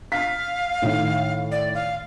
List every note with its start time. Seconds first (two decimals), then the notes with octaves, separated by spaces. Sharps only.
0.12 F5 B6
0.82 A2 D#3
1.52 D5
1.75 F5